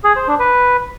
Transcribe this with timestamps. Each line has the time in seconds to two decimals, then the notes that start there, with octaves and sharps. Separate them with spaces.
0.04 G#4
0.16 C5
0.28 D4
0.39 B4